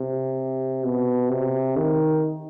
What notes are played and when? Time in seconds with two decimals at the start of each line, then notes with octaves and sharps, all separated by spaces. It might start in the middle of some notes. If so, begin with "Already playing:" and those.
Already playing: C3
0.84 B2
1.30 C3
1.76 D#3